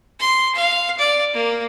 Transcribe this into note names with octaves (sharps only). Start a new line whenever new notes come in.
C6
F5
D5
A#3